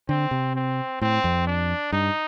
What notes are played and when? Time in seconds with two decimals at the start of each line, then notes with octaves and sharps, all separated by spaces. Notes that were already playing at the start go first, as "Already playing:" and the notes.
0.09 D3 C4
0.31 C3
0.55 C4
1.01 A2 C4
1.24 F2
1.47 D4
1.92 G2 D#4